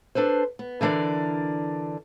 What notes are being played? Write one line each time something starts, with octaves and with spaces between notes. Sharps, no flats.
D4 A4 B4 C5
B3
D3 E3 D4 A#4 D5